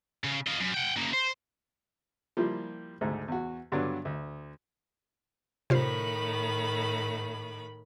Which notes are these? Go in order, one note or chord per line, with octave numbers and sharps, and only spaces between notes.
C#3
F4 D#5
F#2
F#5 G5
C#3 A#3
C5
F3 G3 A#3 E4 F4
D2 G#2 A3
E2 F#4
G2 D3 F#3 B3 D4
D2
A2 C3 D#3 F4 C5 B5